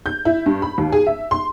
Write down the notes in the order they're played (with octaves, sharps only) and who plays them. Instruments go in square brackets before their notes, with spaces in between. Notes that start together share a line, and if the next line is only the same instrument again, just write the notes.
[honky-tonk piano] G6
E4
G2
B5
D#2
G#4
E5
C6